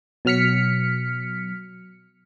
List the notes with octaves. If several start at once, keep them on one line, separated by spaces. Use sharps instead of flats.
B2 F#3 F6 B6 C#7